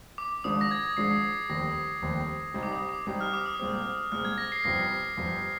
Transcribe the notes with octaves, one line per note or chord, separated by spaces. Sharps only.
D6
G#1 G#2 F3 G#3 D4 D#6
A#6
G#6
A#6
G#1 G#2 F3 G#3 D4 C7
F1 D#2 D#3 G3 C4 A#6
F1 D#2 D#3 G3 C4
C2 C3 G3 C4 D#4
D6
D#6
D6
C2 C3 G3 C4 D#4 D6
F6
D6
D#6
C2 A#2 G#3 C4
C2 A#2 G#3 C4 F6
G#6
A#6
C7
G1 F2 C3 G3 C4 A#6
G1 F2 C3 G3 C4